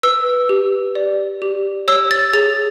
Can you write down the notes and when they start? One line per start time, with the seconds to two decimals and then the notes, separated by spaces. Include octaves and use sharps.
0.03 B4 E6
0.49 G4
0.95 D5
1.42 G4
1.88 C#5 E6
2.11 A6
2.33 G#4 A6